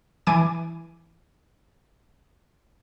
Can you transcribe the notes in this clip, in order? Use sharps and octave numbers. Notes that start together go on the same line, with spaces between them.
E3 G#5 D6 D#7